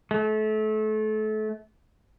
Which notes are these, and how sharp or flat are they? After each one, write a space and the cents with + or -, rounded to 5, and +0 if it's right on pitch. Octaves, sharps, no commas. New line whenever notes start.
A3 -30